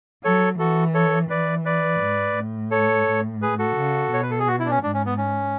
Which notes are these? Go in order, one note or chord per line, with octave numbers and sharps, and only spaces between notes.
F#3 A4 C#5
E3 F#4 A4
A4 C#5
E3 B4 D5
B4 D5
G#2
A2
A4 C#5
A2
G#4 B4
F#4 A4
C#3
B2 C#5
B4
A4
G#4
F#4
E4
D4
C#4
G#2 D4
C#4
B3
C#4